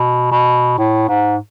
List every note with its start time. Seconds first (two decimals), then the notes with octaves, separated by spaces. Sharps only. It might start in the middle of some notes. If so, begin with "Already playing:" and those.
Already playing: B2
0.31 B2
0.78 A2
1.09 G#2